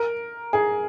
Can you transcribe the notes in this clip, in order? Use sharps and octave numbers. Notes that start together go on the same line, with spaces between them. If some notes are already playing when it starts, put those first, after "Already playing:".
Already playing: A#4
G#4